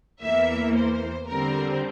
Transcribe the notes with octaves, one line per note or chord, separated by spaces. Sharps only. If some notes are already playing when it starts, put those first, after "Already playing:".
E2 E3 A#3 E5
C5
D3 G3 C4 A#4